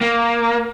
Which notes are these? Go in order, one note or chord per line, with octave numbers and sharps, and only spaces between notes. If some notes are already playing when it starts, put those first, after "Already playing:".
A#3